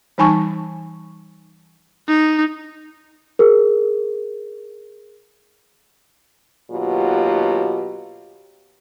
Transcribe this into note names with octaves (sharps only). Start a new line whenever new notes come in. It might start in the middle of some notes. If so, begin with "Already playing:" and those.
E3 G3 D#4 G#5 A5 C#6
D#4
G#4 A#4
D#2 B2 F#3 F4 G4